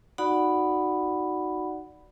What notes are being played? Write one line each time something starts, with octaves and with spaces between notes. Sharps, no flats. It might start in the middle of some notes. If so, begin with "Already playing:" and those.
D#4 F#4 D5 F#5 B5